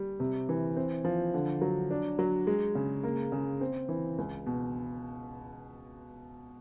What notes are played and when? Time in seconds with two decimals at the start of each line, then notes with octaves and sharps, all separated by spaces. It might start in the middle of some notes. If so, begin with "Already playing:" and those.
Already playing: G3
0.20 C3
0.49 E3
0.77 C4
1.05 F3
1.34 D3
1.62 F#3
1.91 D4
2.19 F#3
2.47 G#3
2.75 C#3
3.04 A#3
3.32 C#3
3.61 C4
3.89 E3
4.18 C#2
4.46 B2